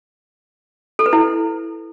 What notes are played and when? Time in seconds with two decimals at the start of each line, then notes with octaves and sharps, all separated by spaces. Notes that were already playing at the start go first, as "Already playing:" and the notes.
0.99 A4
1.06 B4
1.13 E4